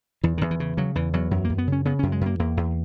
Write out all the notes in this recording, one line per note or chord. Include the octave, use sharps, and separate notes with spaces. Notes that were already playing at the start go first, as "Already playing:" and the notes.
E2 E3
E2 D#3
E3
C#3
C#3 F#3
E2 E3
E2 F#3
F#2 F#3
A#3
F#2
B3
C#3
C#4
C#3 B3
F#2 C#4
G#3
F#2 A#3
E2 A#3
E2